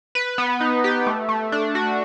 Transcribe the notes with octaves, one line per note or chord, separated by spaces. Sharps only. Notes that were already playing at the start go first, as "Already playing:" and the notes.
B4
B3
D#4
G4
A3
A3
D4
F#4